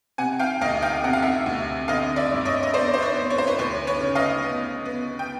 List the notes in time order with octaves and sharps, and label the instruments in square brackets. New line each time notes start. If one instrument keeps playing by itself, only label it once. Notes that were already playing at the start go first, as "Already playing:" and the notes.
[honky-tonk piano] C3 F#5 G#5
F5 G5
D2 D#5 F5
F5 G5
C3 F#5
F5
E5 F#5
D2
D3 D#5 F5
D5 E5
G2
C#5 D#5
D#5
B3 C5 D5
C5
B4 C#5
B3
C#5
C5
B4 C#5
D2 B4 C#5
B4 C#5
C#3
D#5 F5
B3
B3
G5